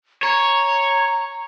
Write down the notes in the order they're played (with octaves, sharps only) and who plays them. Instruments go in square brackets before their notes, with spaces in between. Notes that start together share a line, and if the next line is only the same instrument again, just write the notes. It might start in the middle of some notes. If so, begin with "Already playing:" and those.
[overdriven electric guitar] C#5 [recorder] A#5